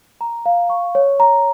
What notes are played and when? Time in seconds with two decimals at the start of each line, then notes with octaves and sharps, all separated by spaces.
0.21 A#5
0.46 F5
0.70 C#6
0.95 C#5
1.20 A#5